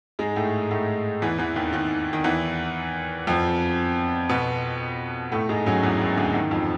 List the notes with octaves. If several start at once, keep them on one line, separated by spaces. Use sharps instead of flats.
G#2 G#3
A2 A3
A2 A3
E2 E3
E2 E3
D#2 D#3
D#2 D#3
D#3
E2 E3
F2 F3
B2 B3
A2 A3
G#2 G#3
F#2 F#3
E2 E3
D#2 D#3
D2 D3
D#2 D#3
F2 F3